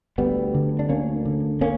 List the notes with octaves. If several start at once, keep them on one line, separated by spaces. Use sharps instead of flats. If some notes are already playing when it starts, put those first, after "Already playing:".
D2 G3 B3
D3
D4
D2 A#3 C#4
D3
A#3 C#4